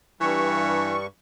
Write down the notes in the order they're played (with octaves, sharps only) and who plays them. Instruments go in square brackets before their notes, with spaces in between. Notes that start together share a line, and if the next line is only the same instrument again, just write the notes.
[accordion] G2 G3 C#6 [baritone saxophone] E3